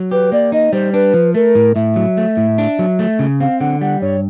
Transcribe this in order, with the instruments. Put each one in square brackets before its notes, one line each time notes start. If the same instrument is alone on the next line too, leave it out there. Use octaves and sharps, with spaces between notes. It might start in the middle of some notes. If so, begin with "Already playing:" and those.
Already playing: [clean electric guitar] F#3
[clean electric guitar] G4 [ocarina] B4
[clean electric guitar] A#3 [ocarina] D5
[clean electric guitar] D#4 [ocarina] D#5
[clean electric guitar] G3 [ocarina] C5
[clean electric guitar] D4 [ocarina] B4
[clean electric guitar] F3
[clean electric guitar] A3 [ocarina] A#4
[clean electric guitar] A2
[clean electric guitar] A2 [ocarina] E5
[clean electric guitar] F#3
A3
A2
D4
F#3
A3
C#3
[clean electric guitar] C4 [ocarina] F5
[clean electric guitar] D3 [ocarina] F#5
[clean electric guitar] G3 [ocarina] F#5
[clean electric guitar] G2 [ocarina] C#5